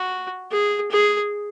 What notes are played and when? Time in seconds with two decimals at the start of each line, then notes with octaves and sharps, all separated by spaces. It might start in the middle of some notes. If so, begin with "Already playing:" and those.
Already playing: F#4
0.52 G#4
0.91 G#4